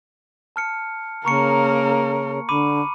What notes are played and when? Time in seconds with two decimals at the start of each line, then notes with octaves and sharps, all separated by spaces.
0.56 A5 F6 C#7
1.25 C#3 A#3 A#4 A#5 C#6 C#7
2.49 D3 B5 D6 D#7